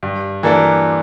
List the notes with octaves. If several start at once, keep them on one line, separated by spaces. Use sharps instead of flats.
G2
E3 A#3 D4 A4